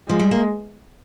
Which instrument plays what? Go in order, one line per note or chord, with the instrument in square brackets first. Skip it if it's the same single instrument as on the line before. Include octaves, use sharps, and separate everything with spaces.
[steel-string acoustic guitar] F3 [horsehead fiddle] G#3
[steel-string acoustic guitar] G3
A#3